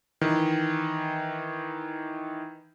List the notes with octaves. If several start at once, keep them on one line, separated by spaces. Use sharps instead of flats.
D#3 E3